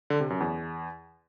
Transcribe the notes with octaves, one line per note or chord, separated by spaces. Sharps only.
D3
C3
F#2
E2